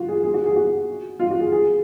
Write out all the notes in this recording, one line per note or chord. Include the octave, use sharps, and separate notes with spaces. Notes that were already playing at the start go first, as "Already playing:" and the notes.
Already playing: F4 F#4
G#4
G#4
F#4
G#4
F#4
F4
F#4
G#4
G#4